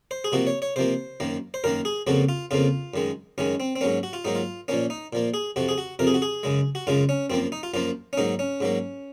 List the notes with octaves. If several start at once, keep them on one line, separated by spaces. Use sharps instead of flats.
C5
G#4
C3 F3 A#3 F#4
C#5
C#5
C3 F3 A#3 C5
F#2 D#3 A#3
C5
F#2 D#3 A#3 A#4
G#4
F2 C#3 F3 A#3 F#4
F4
F2 C#3 F3 A#3 F4
F#2 D#3 G#3
F#2 D#3 G#3 C#4
C4
C4
G#2 F#3 A#3 C#4
F#4
F4
G#2 F#3 A#3 D#4
F4
A#2 F3 A#3 C#4
D#4
A#2 F3 A#3
G#4
F2 C3 F3 F#4
G#4
F#4
F2 C3 F3 A#4
G#4
F#4
G#4
F#2 C#3 G#3
F#4
F#2 C#3 G#3 F4
C#4
F#2 F3 A#3 C4
D#4
F4
F#2 F3 A#3 F4
C#4
G#2 F#3 A#3 D#4
C#4
G#2 F#3 A#3